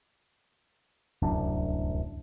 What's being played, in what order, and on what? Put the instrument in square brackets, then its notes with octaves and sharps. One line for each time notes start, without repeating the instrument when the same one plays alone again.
[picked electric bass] D1 C2 F#2 D4